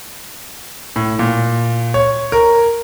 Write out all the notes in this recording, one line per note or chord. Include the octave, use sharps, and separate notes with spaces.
A2
A#2
C#5
A#4